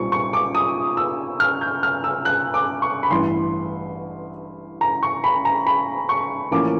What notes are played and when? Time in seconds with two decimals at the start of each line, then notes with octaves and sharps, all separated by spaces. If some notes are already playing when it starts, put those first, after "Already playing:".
Already playing: B1 A#2 G3 C4 F4 C#6
0.12 C#6
0.33 D6
0.55 D#6
0.97 E6
1.40 F6
1.61 G6
1.83 F6
2.04 E6
2.25 F#6
2.54 D6
2.82 C#6
3.03 B5
3.11 A1 G2 E3 C6
4.81 A#5
5.03 C#6
5.24 B5
5.45 A#5
5.67 B5
6.09 C#6
6.51 A1 A2 F3 A#3 C#4 D6